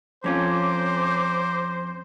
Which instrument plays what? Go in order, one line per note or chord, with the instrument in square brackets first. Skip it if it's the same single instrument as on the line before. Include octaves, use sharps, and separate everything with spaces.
[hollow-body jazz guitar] F2 C#4 F4 [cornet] C5 [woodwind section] C#5 A#5 D6